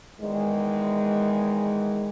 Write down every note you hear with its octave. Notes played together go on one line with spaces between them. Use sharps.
E2 D#3 G#3